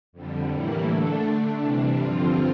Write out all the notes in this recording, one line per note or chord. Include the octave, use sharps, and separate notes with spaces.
F2 D3 G3
A2 E3 G3 A#3 E4
D3 A3 D4 A4
D3 A3 D4
C3 E3 G3 D4
G2 D3 F3 C4 F4